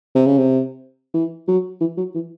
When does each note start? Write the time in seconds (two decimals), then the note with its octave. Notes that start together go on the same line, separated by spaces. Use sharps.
0.15 C3
0.27 C#3
0.38 C3
1.14 E3
1.48 F#3
1.81 E3
1.97 F#3
2.15 E3